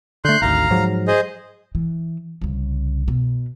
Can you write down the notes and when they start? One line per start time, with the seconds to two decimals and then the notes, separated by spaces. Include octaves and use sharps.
0.25 D3 A3 C6 F#6 G6
0.42 G#1 D2 F5 A#5
0.71 G#2 F3 F#3
1.08 G#4 C5 D#5
1.75 E3
2.41 C2 C#3
3.08 B2